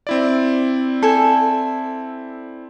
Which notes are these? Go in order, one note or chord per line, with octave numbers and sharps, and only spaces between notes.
C4 E4 D5
A4 G#5